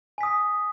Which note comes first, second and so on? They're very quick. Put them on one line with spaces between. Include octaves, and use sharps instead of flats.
G#5 B6 D#6